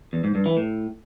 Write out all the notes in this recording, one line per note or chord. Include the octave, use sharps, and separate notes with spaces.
E2
G#2
G2
E3
A2